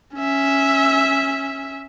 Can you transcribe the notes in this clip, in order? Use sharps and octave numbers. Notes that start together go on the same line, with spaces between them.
C#4 E5